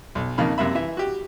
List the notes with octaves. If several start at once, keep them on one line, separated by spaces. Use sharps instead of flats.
B1
F2 C#3 A#3 D#4 B5
F#2 C3 A#3 E5 B5
E3 E5
F#4 G4